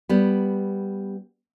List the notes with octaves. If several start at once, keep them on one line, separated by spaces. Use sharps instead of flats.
G3 B3